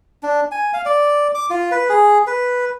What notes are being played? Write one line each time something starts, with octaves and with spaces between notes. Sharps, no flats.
D4
G#5
F5
D5
D6
F4
B4
G#4
B4